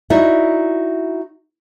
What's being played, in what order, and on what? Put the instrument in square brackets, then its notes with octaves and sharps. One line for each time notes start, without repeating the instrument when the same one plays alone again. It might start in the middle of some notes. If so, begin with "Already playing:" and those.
[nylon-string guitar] D#4 E4 F#4 D5 E5